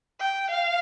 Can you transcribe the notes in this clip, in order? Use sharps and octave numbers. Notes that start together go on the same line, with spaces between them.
G5
F5